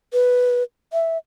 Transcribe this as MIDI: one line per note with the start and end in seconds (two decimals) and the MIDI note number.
0.13 0.63 71
0.93 1.18 76